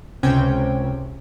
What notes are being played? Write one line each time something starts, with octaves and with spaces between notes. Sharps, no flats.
C#2 C3 C4 C#4 G5 G#6